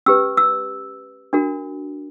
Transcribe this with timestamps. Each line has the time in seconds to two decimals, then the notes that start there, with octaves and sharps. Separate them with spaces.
0.06 C#4 G4 B4 E6
0.37 E6
1.33 D4 F#4 A#4